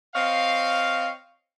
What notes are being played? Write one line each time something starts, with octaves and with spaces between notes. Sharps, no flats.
C4 C#5 D#5 F5